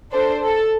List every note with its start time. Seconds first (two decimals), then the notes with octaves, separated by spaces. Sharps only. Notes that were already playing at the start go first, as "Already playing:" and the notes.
0.12 D4 A4 C5
0.41 A4